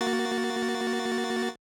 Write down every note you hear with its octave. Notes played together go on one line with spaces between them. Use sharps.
A#3 F#4 A6